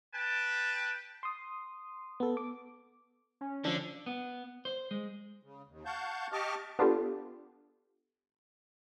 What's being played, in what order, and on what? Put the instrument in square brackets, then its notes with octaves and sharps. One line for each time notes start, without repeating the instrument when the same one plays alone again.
[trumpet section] B4 G5 A5
[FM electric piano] C6 D#6
B3 A4
D6
[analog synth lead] C#4
[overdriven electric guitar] D3 [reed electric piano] F3 D4
[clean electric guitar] B3
C5
G#3
[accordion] C#3
D#2
F5 F#5 A5 C#6 G6
G4 D#5 A5 C#6 D6 F6
[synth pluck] B3 D4 F4 G4 A4